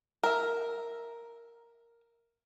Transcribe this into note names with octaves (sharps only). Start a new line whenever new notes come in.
A#4 E5